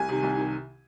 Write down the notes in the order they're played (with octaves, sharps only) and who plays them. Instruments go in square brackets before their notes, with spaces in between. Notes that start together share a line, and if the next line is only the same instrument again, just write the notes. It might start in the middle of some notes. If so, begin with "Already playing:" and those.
Already playing: [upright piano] C2 G#5
C3 D#3
C2
C3 D#3